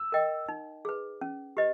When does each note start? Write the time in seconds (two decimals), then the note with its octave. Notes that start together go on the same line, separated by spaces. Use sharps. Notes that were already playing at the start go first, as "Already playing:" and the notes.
Already playing: E6
0.12 A#4 D#5 G5
0.48 D#4
0.85 G#4 B4
1.21 C#4
1.57 G4 B4 D#5